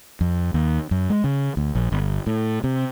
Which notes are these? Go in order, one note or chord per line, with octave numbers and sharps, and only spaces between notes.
F2
D#2
F#2
G#3
C#3
D2
A#1
G1
A2
C3